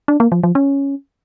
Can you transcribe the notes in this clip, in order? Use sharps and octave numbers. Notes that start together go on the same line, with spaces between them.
D4
A#3
F3
F3
C#4